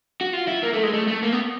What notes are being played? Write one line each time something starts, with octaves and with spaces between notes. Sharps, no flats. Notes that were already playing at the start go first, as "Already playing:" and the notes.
F#4
F4
E4
A#3
A3
G#3
A3
A3
A#3
B3